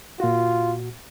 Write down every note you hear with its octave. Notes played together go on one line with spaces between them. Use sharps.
A#2 F4 F#4